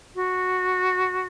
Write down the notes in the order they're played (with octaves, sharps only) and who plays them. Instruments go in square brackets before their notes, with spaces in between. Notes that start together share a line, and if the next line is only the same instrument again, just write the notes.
[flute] F#4